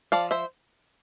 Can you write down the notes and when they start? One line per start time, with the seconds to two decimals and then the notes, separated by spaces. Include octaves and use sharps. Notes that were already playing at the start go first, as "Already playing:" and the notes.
0.12 F3 D5 F5
0.31 C5 E5